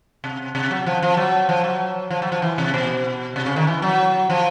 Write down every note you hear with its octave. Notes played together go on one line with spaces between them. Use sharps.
C3
C3
F#3
F3
F3
F#3
F3
F#3
F3
F#3
F3
E3
C3
B2
C3
C#3
D#3
E3
F#3
F3